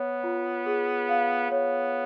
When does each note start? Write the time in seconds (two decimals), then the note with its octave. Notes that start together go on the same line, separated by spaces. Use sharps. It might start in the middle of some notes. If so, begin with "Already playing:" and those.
Already playing: B3 C#5
0.23 F4
0.66 G#4
1.09 F5
1.51 B3 C#5